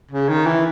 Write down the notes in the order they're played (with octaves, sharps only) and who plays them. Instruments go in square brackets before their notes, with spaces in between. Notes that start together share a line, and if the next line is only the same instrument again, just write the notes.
[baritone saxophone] C#3
D#3
E3